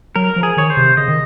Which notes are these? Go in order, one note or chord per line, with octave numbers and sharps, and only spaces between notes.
F#3 A#4
F3
G#4
D#3 C#5
C5
C3
C#3 D#5
D#3